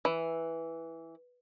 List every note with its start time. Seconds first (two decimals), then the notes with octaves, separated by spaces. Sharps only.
0.05 E3